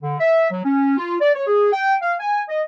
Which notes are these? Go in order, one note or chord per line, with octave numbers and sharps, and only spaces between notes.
D3
E5
F#3
C#4
F4
D5
C#5
G#4
G5
F5
G#5
D#5